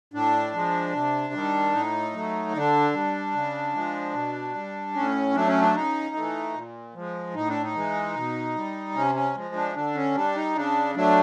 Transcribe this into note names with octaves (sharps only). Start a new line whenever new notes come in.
A2 D4
F3 G#3
C3
D#3 G3
A2 D#4
F#3 A3
D3 D4
G3
C#3
F3 G#3
B2
G3
A2 C#4
F#3 A3 D4
C#4
D4
C#3 D#4
E3 A3
A#2
F3 G#3
A2 D#4
D4
D#4
E3 G#3
B2
G3
C3 C#4
C#4
F3 G#3
D4
D3 D4
C#4
G3 D4
D#4
C#3 D4
F#3 A3 D4